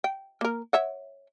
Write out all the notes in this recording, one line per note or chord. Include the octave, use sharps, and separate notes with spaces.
G5
A#3 A#4
C#5 E5 F#5